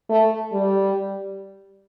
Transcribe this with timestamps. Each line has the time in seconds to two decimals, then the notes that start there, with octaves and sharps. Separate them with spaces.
0.09 A3
0.53 G3